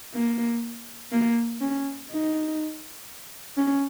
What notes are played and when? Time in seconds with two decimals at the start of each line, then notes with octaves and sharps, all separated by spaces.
0.14 A#3
1.12 A#3
1.61 C#4
2.10 D#4
3.58 C#4